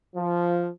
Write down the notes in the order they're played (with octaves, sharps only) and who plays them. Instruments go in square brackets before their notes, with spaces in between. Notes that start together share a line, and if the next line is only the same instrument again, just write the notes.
[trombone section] F3